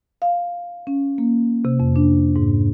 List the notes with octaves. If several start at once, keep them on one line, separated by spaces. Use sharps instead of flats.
F5
C#4
A#3
C3
F2
D4
G#2